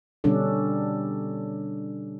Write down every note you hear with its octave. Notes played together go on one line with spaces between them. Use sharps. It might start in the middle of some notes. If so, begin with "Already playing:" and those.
B2 D3 G3 C#4 D4 A4